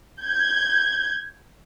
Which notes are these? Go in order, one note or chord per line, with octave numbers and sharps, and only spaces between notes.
G6 G#6